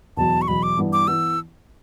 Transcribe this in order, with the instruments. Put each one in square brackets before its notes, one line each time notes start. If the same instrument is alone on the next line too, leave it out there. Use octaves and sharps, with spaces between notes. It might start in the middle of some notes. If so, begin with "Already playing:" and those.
[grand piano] E2 B2 F#3 [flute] A5
[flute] C#6
[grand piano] E2 B2 F#3 [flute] B5
[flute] D6
[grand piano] G2 E3 B3
[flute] D6
[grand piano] E3 B3 [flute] E6